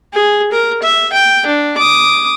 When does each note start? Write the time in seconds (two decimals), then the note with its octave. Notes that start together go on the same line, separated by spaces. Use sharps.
0.13 G#4
0.52 A#4
0.83 E5
1.13 G5
1.46 D4
1.77 D6 D#6